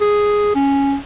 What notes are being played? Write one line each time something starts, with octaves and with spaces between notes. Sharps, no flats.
G#4
C#4